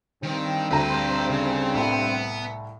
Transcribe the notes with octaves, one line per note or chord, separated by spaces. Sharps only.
G2 D#3 C4
D2 B4 C5 A#5
C#3
C2 A2 B3